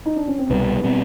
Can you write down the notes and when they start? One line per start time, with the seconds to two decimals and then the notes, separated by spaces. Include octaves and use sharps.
0.06 D#4
0.16 D4
0.28 C#4
0.38 C4
0.49 C2 B2 G3 B3
0.84 B2 G3 C4